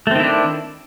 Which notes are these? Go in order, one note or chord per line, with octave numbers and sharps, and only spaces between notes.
D#3 A3 C4 D4 E4